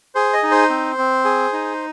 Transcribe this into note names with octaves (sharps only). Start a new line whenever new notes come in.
G#4 C5
D#5
D#4
C5
C4
C4
G#4
D#4